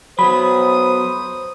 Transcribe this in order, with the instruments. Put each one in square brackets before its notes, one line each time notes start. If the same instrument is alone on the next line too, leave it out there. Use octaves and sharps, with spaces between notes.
[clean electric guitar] F#3 B3 [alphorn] C5 [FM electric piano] B5 [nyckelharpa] D#6